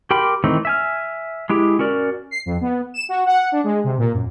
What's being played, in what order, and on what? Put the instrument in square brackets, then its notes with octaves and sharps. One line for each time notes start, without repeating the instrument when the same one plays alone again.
[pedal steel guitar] G4 A#4 G5 B5 C6
D#3 E3 A3 C4 D#4
E5 G#5 F6
G#3 E4 G4
C#4 F#4 A#4 D5
[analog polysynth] C7
F2
B3
E7
F#4
F#5
D4
G#3
C3
A#2
F#2